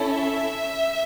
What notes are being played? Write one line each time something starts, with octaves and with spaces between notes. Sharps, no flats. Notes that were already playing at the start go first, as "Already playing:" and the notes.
Already playing: C#4 E4 A4
E5